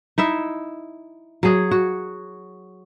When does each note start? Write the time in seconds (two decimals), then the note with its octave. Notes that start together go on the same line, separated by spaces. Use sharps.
0.18 D#4 E4 E5
1.43 F#3 G#4
1.71 F#4